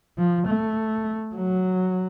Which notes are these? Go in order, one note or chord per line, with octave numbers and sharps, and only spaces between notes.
F3
A3
F#3